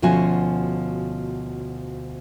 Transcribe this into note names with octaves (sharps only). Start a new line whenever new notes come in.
D2 B2 F3 C#4 F#4 G#5